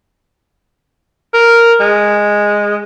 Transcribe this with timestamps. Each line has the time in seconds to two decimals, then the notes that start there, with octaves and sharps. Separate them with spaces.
1.34 A#4
1.80 G#3